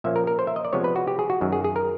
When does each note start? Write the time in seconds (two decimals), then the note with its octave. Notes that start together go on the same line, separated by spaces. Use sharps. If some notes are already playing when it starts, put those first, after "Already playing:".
0.04 A#2 F3 A#3 C#4 E5
0.16 A#4
0.27 A#4
0.39 C5
0.47 E5
0.56 D#5
0.65 D5
0.73 C3 F3 G#3 B3 C#5
0.84 B4
0.96 F#4
1.08 G4
1.19 G#4
1.30 F#4
1.41 F#2 D#3 F#3
1.52 G#4
1.64 G#4
1.76 A#4